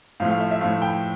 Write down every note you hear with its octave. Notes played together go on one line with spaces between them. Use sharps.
A2 F3 A3 F5
F5
E5
E5
A2 F3 A3 F5
G5